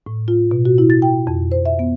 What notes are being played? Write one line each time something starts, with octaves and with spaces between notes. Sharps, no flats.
A2
F4
B2
F#4
E4
A6
G5
F2
C5
E5
B3